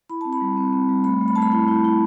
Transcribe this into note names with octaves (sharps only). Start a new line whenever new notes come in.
E4 B5
C4 A5
B5
G3
C4
C4
G3
A3 B5
A3
B5
A3 A5
B5
E4 A5
E4
E4